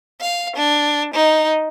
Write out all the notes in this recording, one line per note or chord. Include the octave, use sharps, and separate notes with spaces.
F5
D4
D#4